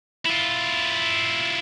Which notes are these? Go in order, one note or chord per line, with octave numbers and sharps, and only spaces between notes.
E4 F4